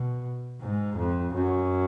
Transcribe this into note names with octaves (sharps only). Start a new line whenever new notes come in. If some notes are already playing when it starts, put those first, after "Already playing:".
Already playing: B2
G#2
F2
F#2